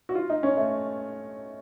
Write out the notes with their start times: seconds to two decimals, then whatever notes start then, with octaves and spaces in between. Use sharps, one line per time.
0.09 F#4
0.15 F4
0.30 D#4
0.43 C#4
0.57 A3